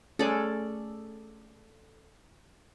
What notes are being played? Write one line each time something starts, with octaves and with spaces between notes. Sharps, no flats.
A3 C#4 G#4 A4 D5 G#5